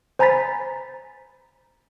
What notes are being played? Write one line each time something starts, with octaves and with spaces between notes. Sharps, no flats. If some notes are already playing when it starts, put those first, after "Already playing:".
C5 G#5 A#5 B5 A6 B6